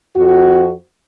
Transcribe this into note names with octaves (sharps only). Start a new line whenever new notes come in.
F2 F#4